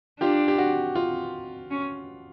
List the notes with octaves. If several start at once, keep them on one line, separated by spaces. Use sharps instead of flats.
D4 F4 G4
G4
F#4
F4
C#4